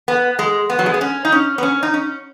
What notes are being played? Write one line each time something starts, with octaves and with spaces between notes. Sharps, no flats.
B3
G#3
B3
F#3
G#3
B3
C#4
D#4
C#4
B3
C#4
D#4
C#4